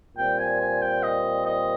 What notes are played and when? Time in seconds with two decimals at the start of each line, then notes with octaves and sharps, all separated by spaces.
0.17 A#2 G3 C4 G5
0.39 G#5
0.60 G#5
0.81 G5
1.03 D#5
1.46 D#5